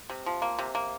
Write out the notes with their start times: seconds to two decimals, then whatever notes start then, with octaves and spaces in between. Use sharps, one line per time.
0.10 C3
0.26 F3
0.42 A#3
0.59 C3
0.75 A#3